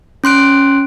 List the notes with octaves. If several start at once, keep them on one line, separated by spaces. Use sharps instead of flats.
C#4 C6 F#6 D7